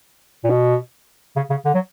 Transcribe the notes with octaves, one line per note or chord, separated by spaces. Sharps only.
A#2
B2
C#3
C#3
D3
F#3